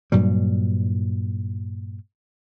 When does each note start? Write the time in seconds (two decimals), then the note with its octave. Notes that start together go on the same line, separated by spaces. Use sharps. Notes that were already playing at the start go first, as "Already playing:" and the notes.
0.12 G2 A#2 F#3 G3